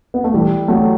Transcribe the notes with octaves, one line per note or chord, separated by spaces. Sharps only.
B3
A3
E3 G3
F#3 A3